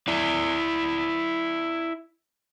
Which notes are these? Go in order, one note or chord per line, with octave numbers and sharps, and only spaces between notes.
E4 D5